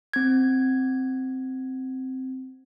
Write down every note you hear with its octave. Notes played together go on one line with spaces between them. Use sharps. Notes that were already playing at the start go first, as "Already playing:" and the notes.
C4 G#6